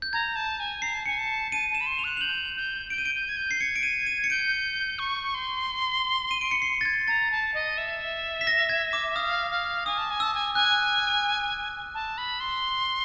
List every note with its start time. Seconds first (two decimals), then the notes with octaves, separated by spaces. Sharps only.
0.02 G6
0.13 A#5 G#6
0.36 A5
0.60 G#5
0.82 A#5 C7
0.94 A5
1.06 G#5 C#7
1.19 A5
1.52 A5 D#7
1.70 A5 E7
1.81 B5
1.86 C6
1.99 F7
2.04 F#6
2.17 F7
2.21 G6 F#7
2.56 G6
2.90 G6 D7
2.98 D#7
3.05 D7
3.15 G6
3.29 G#6
3.37 G6
3.51 C7
3.61 G#6 C#7
3.76 D7
3.83 D#7
4.07 D#7
4.24 C#7
4.30 G6 D7
4.99 C#6
5.34 C6
6.31 D#7
6.41 D7
6.51 C#7
6.62 C7
6.81 A6
6.85 G#6
7.08 A#5 A6
7.31 A5
7.54 D#5
7.78 E5
8.41 B6
8.47 A#6
8.69 G#6
8.93 D6
9.16 F5 D#6
9.51 F5
9.86 G#5 D#6
9.98 A5
10.11 G#5
10.20 A5 E6
10.34 G#5
10.55 G#5 F#6
11.94 A5
12.18 B5
12.40 C6